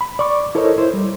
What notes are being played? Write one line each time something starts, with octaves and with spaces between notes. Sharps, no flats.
B5
D5 C#6 D6
E4 A4 A#4 C5 C#5 D#5
E4 C5
G3